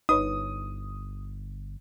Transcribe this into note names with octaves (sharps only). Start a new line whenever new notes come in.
G1 D#4 B4 C#5 D#6